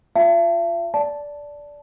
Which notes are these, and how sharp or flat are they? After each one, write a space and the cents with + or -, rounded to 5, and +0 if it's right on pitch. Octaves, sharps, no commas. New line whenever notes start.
F4 +0 E5 +45 A5 +15
D5 -10 A5 +0